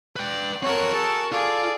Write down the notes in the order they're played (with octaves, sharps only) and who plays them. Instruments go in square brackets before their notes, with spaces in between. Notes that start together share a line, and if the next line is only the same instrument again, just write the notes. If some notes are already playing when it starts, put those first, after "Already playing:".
[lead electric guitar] B4 G5 [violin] D5
[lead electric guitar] C4 A4 [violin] F#4 A#4 [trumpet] C#5
[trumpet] G#4 [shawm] A4 [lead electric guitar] A5
[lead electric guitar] F4 F5 [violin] G#4 [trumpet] A4 [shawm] D5